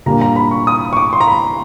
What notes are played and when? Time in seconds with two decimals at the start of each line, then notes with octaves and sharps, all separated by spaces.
0.06 A#2 G3 A#3 D4 A#5
0.21 A#5
0.36 B5
0.51 C#6
0.67 D#6
0.93 C#6
0.97 D6
1.13 C6
1.21 A#5
1.27 B5